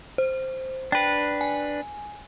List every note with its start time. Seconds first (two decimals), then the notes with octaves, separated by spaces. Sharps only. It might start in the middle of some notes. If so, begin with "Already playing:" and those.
0.18 C5
0.92 D4 B4 G5
1.41 G#5